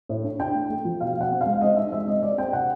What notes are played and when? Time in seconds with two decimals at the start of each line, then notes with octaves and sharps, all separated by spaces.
0.09 A2
0.24 D4
0.39 D4 G5
0.55 A3
0.70 A3
0.85 F3
1.00 B2 F5
1.15 B2
1.21 F#5
1.31 C4
1.41 G#3 F5
1.61 C4 D#5
1.77 D#4 E5
1.92 G#3 E5
2.07 C4 D#5
2.22 C4 D5
2.38 C4 G5
2.53 C3 F#5